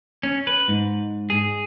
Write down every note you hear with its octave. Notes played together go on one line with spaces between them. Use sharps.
C#4
B4
G#2
G#4